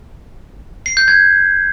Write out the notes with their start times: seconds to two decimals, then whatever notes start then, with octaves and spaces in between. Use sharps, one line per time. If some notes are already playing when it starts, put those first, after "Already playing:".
0.86 C7
0.97 G6
1.08 G#6